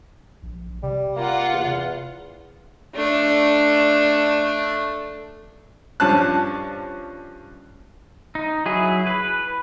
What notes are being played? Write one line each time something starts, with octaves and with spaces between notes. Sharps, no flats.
A#1
C3 G3
A#3 F4 F#5
E2
A3 D4
G2 F3 C#4 A5 F#6
D#4
F#3 E4 G#4
B4